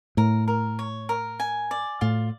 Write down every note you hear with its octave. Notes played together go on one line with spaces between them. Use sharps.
A2 A#4
A#4
C#5
A#4
G#5
D5
A2 F4